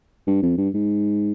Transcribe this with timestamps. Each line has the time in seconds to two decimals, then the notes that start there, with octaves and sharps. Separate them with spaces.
0.27 G2
0.42 F2
0.58 G2
0.74 G#2